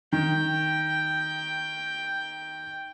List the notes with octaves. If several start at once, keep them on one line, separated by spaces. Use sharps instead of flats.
D#3 G5